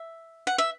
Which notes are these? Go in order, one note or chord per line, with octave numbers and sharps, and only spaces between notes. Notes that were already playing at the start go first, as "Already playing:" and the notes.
Already playing: E5
F#5
E5